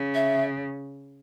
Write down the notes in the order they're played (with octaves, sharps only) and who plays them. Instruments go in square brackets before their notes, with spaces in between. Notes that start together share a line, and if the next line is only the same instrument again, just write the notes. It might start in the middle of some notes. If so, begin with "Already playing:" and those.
Already playing: [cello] C#3
[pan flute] E5